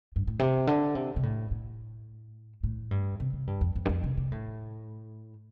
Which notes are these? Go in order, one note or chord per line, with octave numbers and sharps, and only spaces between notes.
G2
A2
C3
D3
C3
C3
A2
A2
A2
G2
C3
C3
G2
F2
F2
G2
F2
C3
C3
A2